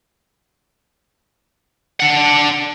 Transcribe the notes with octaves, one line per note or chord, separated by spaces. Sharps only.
D4 F#5